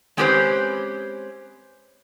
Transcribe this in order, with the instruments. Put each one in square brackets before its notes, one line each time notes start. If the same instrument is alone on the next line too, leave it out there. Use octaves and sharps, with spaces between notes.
[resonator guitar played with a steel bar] G#3 C4 C#4 G4 B4 C5